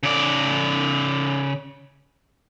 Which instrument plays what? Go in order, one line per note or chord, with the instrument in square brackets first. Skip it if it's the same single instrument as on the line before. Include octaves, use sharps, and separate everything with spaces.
[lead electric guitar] C#3 D5